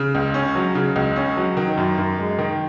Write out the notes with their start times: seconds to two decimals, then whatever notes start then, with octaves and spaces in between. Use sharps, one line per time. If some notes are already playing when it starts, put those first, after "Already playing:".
Already playing: C#3
0.15 C#2
0.34 C#4
0.55 F#3
0.75 C#3
0.96 C#2
1.16 C#4
1.37 F#3
1.57 D#3
1.77 F#2
1.98 F#2
2.18 G#3
2.39 D#3